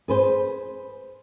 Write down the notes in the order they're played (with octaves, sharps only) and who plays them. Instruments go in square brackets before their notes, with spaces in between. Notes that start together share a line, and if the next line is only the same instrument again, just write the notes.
[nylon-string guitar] G#4 B4 C5